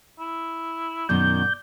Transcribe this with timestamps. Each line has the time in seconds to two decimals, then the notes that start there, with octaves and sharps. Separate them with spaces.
0.19 E4
1.09 F#2 B2 D#3 D5 G6